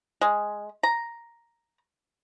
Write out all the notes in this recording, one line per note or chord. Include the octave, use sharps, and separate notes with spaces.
G#3
A#5